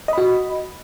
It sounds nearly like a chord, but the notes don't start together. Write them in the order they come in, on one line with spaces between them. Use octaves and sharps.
D#5 B5 F#4